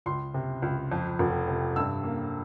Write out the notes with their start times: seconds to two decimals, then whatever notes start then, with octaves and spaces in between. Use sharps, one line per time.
0.06 C#2 C6
0.34 C3
0.62 C#2
0.92 F2
1.19 F1
1.48 C3
1.76 G2 E6
2.04 A#3